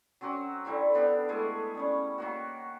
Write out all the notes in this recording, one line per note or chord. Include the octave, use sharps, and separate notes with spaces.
F#3 C4 C#4 F#4
D3 G3 C4 E4
B3 D4 G4 F5
G#3 A3 E4 G#4
G3 C#4 C#5
D#3 A#3 F#4